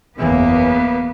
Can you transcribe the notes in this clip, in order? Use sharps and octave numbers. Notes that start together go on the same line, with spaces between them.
F#1 E2 E3 A#3 B3